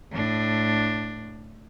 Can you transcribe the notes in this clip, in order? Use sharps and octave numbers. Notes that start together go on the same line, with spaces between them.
A2 D4